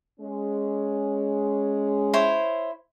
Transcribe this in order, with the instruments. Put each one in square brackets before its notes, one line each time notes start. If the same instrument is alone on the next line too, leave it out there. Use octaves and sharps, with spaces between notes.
[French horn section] G#3 C#4
[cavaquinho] E4 C5 C#5